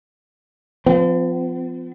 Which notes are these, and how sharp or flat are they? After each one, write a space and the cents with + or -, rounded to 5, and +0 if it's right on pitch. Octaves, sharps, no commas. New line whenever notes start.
F3 +0 C4 -45